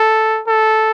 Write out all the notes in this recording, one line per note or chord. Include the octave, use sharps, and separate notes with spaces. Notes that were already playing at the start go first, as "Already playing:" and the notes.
Already playing: A4
A4